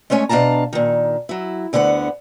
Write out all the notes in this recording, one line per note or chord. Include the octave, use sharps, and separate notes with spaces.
G#3 A3 C#4 C#5 G#5
B2 D4 F5 A5 A#5
A#2 D#3
F#3 E4
D2 D3 B3 B4 F#5